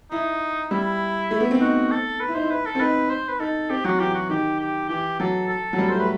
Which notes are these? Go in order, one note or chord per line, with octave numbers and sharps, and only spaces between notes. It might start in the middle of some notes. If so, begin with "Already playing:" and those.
D#4 E4
G3 E4
A3
B3
C4
D#4 F#4
A4
B4
E4
D#4 C5
E4
B4
A4
C4
D#4 B4
C5
B4
D#4 A4
C4 G4
F#3 F#4
E3 G4
F#4
D#3 G4
G4
E3 G4
F#3 A4
A4
F#3
G3
A3 C5
B4